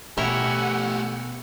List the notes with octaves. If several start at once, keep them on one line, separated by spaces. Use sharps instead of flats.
B2 A3 E4 G4 A#4 C#5 F#5 G#5